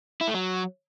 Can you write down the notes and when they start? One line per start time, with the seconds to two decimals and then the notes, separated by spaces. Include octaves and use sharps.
0.21 E4
0.27 A3
0.34 F#3